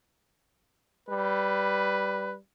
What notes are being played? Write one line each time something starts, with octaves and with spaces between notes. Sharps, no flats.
G3 B4